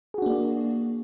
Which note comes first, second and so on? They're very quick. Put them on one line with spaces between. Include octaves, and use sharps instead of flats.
G#4 F#4 D4 A#3 D5